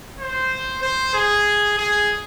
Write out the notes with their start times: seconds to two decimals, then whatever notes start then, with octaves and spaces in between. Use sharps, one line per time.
0.20 C5
0.82 C5
1.14 G#4
1.78 G#4